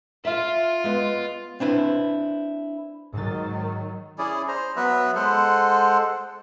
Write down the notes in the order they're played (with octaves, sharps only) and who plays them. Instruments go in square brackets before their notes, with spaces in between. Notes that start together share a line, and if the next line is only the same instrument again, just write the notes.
[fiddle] F4 [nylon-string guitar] E5 F5
[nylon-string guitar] G#3 B3
[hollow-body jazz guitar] C4 D4 E4 B4
[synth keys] G#2 A6 [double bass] D#3 F#3
[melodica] C#4 E4 G#4 D5
C5 A#5
F#3 B3 B4 E5
G#3 A4 C5 F#5